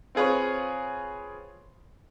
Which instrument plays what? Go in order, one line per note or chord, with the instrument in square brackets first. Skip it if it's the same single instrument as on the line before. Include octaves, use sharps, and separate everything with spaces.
[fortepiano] C4 F4 G#4 B4 C#5